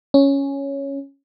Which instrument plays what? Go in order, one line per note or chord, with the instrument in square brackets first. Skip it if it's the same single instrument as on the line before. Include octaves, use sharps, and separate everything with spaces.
[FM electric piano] C#4